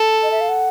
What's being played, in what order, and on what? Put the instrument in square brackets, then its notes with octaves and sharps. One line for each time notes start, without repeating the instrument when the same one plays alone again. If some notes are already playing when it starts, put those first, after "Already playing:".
Already playing: [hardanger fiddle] A4
[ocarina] D#5
E5
F5
F#5